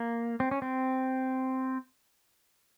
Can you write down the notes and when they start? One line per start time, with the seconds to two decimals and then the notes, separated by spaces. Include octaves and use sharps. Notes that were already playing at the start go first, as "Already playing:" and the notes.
Already playing: A#3
0.40 C4
0.51 C#4
0.62 C4